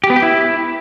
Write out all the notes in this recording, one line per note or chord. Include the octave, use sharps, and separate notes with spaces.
G4
B3
G4
E4